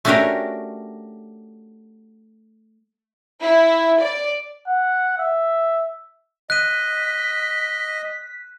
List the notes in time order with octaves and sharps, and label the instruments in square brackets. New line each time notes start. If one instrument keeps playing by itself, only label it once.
[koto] A3 C#4 D4 F#4 G4 A#4
[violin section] E4
D5
[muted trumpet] F#5
E5
[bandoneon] D#5 [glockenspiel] F#6 D#7 [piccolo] B6